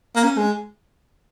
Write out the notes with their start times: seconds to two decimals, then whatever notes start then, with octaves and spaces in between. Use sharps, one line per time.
0.16 A#3
0.24 C#4
0.38 G#3